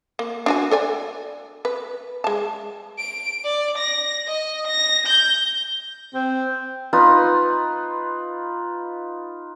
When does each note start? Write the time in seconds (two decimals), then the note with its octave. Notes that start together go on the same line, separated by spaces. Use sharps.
0.19 A#3
0.46 D4 F#4 G#5
0.71 A4 D5 G#5
1.65 B4
2.24 G#3 A5
2.98 D7
3.44 D5
3.78 A#6
4.28 D#5
4.67 A#6
5.06 G6
6.14 C4
6.93 D#4 F4 B4